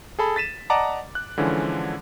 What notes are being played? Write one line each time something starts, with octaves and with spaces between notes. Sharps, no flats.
G#4 A4 B5
A6 B6 D#7 E7
D5 D#5 F#5 A5 A#5 D6
F#6
D3 E3 F3 G#3 C#4